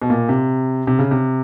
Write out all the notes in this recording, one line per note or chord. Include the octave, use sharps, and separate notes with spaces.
B2
A#2
C3
C3
C#3
C3